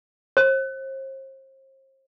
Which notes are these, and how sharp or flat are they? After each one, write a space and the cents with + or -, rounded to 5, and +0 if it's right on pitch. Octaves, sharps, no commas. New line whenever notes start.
C5 +35